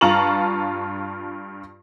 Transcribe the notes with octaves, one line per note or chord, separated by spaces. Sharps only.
G2 F4 A5 A#5 C#6 F#7